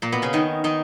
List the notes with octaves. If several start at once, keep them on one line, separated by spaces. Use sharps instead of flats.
A#2 A#3
B2 B3
C#3 C#4
D#3 D#4
D#3 D#4